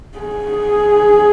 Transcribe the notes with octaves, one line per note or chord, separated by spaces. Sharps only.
G#4